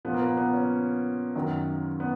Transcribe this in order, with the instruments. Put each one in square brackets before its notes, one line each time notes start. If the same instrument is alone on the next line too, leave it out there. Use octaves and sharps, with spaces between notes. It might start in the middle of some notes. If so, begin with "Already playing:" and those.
[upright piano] A#2 F3 B3
A#3
B3
B3
C#4
F#2 D#3 F#3
B3